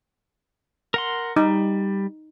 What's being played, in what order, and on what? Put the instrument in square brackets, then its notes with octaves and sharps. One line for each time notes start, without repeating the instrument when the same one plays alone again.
[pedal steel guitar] A#4 F#5 C6
[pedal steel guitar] G3 [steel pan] D#4